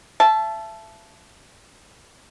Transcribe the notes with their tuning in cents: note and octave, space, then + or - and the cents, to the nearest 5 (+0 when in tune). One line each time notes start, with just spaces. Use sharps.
E5 +30 A5 -15